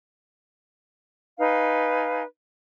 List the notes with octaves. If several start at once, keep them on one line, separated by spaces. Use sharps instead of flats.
D#4 B4 F5 G#5